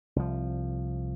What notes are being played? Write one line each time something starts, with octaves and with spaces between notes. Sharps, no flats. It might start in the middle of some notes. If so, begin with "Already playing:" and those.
C2 F3